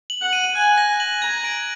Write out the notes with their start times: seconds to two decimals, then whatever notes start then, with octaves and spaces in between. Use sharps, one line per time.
0.10 F#7
0.22 F#5
0.33 D#7
0.55 G#5 F#6
0.78 A#6
0.89 G#5
1.00 F#7
1.22 A#5 G#6
1.45 D7